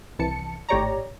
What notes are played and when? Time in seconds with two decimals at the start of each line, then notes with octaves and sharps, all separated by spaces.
0.19 C2 E3 A5 C#7
0.69 G#1 A2 G4 C#5 D5 A#5